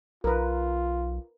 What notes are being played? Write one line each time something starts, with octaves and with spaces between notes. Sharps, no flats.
B1 F4 A#4 B4